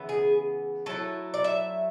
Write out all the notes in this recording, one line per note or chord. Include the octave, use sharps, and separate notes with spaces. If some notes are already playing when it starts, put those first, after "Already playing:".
Already playing: C#3 E3 B3
G#4
F#3 A3 E4 A4
D5
E5